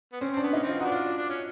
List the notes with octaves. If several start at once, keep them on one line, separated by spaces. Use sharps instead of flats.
B3
C4 C#4
C4 D4
B3
C#4 D#4
E3 C4
F4
B3 D4 D#4 F#4
F4
D4
C#4